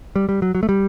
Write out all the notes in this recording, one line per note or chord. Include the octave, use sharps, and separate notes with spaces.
G3
G3
F#3
F#3
A3
G3